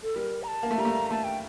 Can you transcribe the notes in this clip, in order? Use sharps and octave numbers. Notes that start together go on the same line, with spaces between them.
A4
G3 A#4
A#5
A5
A#3
A3
G3 A#5
A3
A3 A5
G5